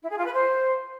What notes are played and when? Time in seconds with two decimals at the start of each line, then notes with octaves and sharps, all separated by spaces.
0.02 E4
0.09 G#4
0.17 F4
0.25 B4
0.32 C5